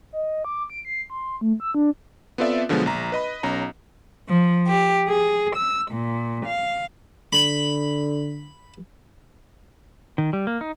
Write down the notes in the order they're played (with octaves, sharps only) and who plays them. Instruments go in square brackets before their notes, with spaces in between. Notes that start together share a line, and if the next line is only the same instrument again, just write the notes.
[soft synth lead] D#5
D6
D7
C7
C6
A3
E6
D4
[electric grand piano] B3 C4 F4 A4 D5 E5
B2 D3 F3 F#3 G#3 B3
A#1 A#5
B4 D#5 B5
B1 C#4 A#5
[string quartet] F3
G4
G#4
E6
A#2
F5
[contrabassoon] D3 [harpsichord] B5
[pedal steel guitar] D#3
G3
A#3
D#4